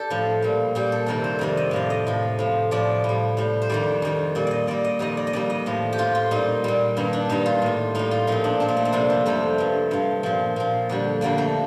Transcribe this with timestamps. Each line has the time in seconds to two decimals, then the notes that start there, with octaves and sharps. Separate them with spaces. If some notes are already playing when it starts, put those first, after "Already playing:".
Already playing: G4 A4 D5
0.10 A2 F3
0.42 A#2 G3
0.75 A#2 G3 G4
0.92 A4
1.06 F2 C3 D#3 G3 A#4
1.24 C5
1.39 F2 C3 D#3 G3 D5
1.57 D#5
1.71 A2 F3 D5
1.90 D#5
2.07 A2 F3
2.39 A2 F3
2.71 A2 F3 D5
3.04 A2 G3
3.37 A2 G3
3.62 C5
3.69 F2 D#3 G3 D5
4.02 F2 D#3 G3
4.35 A#2 G3 D5
4.47 D5 D#5
4.67 A#2 G3 D5
4.84 D#5
4.99 F2 D#3 G3 D#5
5.17 D5
5.27 D#5
5.33 F2 D#3 G3 D5
5.50 D#5
5.66 A2 F3
5.92 G4
5.98 A2 F3 F4
6.15 F4
6.31 A#2 G3 D#4
6.64 A#2 G3
6.97 G2 D#3 G3
7.13 D4
7.29 G2 D#3 G3 D#4
7.46 F4
7.62 A2 G3
7.95 A2 G3 D#4
8.11 F4
8.27 A#2 F3 D#4
8.44 D4
8.60 A#2 F3 C4
8.68 A#3
8.77 A3
8.85 A#3
8.92 F2 C3 G3 D4
9.10 C4
9.26 F2 C3 G3 A3
9.58 G2 F3
9.91 G2 F3
10.23 A#2 F3
10.56 A#2 F3
10.89 F2 D3 G3
11.21 F2 D3 G3 A#3
11.38 A3